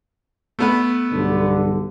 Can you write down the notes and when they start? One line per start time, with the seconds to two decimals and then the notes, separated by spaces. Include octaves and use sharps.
0.59 A3 B3 B4
1.12 B1 G2 D3